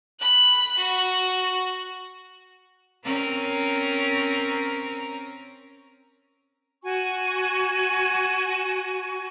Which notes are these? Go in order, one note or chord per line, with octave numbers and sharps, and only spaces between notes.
B5 F#6
F#4
C4 C#4 A#4
F#4 G#5 C#6